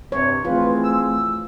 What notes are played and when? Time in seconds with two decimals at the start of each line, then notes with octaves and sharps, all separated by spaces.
0.12 G2 C3 C#5
0.45 E3 A3 C4 F4 G#4 B4
0.84 E6